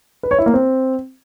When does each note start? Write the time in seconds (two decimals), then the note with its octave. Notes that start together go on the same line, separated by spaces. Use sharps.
0.23 B4
0.31 C#5
0.39 E4
0.46 A#3
0.54 C4